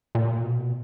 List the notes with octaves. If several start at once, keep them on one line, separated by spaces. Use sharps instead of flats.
A#2
B2